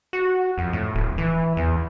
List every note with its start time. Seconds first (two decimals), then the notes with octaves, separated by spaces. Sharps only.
0.13 F#4
0.58 F2
0.73 A2
0.95 D1
1.18 E3
1.57 E2